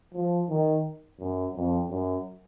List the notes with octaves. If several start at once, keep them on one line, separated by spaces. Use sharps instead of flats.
F3
D#3
F#2
F2
F#2